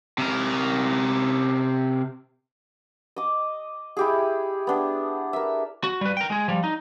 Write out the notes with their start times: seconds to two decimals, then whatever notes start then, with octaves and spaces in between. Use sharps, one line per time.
0.18 C3 A#4
3.16 D#5 D6
3.97 E4 G4 G#4
4.67 B3 D4
5.33 A#4 E5
5.84 F#4
6.01 G3 B4
6.17 A#4 G5
6.30 G#3 G#4
6.48 F3 G3
6.64 D#4